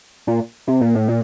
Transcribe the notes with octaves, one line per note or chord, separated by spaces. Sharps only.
A#2
C3
A#2
A2
A#2